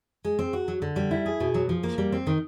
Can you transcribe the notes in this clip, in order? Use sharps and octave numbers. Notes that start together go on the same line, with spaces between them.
G#3
C4
F#4
F#3
D3
G3
E4
G#4
B2
F#3
F3
A#3
G3
C4
D#3